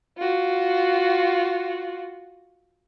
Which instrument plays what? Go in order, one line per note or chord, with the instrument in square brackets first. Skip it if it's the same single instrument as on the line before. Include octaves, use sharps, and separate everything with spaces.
[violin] F4 F#4